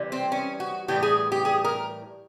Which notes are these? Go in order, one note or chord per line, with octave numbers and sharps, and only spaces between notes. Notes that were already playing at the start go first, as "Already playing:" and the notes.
Already playing: C3 E3 G3
C4
C#4
F#4
A2 E3 G3 G4
G#4
G4
G#4
A#4